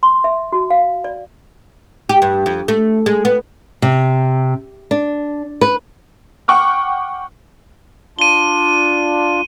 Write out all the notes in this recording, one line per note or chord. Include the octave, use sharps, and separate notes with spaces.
C6
E5
F#4
F5
D5
G4
G2
F2
A3
G#3
B3
C3
D4
B4
F#5 G5 C#6 D6 F6
D4 F4 D#7 G7